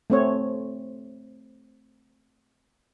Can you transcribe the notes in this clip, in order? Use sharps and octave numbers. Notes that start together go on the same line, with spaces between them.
A3 C4 C#5